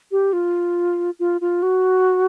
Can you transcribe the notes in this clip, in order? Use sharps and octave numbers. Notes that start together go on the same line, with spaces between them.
G4
F4
F4
F4
F#4